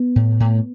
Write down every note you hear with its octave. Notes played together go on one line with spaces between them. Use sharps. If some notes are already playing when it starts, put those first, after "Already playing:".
Already playing: B3
A2
A2